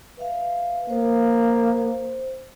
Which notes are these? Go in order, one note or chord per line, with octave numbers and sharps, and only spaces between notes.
B4 E5 F5
A#3 C5